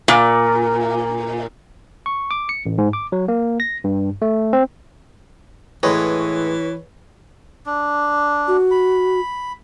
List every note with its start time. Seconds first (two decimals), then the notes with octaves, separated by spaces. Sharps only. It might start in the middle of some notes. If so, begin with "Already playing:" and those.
0.08 A#2
2.06 C#6
2.31 D6
2.49 C#7
2.66 A1
2.78 G#2
2.93 D6
3.12 F#3
3.28 A#3
3.60 A#6
3.84 G2
4.22 A3
4.53 C4
5.83 A2 E3 G#3 B4 C#5
7.66 D4
8.48 F#4
8.71 B5